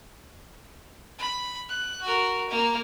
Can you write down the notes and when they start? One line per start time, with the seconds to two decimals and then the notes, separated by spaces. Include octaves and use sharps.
1.19 B5
1.69 F#6
2.02 F#4 A#4
2.49 A#3 A#5